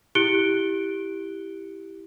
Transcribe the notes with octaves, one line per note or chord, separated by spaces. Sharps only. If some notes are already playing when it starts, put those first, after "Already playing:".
E4 G4 F#6 C#7 D7 G7